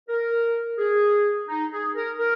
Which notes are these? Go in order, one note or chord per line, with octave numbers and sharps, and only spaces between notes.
A#4
G#4
D#4
G#4
A#4
A#4